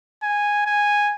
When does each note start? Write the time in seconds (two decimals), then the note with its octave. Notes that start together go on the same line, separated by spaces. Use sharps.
0.23 G#5
0.66 G#5